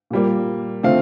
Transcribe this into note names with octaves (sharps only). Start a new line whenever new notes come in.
A#2 G3 A#3
D3 F3 A3 C4 F5